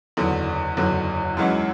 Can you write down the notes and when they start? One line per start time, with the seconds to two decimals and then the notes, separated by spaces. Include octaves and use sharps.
0.17 F#1 E2 D3 F#3
0.77 F#1 E2 D3 F#3
1.37 F#2 E3 G#3 C#4 F#4